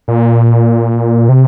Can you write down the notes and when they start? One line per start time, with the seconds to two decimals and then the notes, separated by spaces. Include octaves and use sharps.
0.08 A#2
1.29 C3